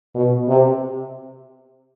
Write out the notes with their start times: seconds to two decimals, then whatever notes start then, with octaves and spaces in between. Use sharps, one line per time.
0.15 B2
0.48 C3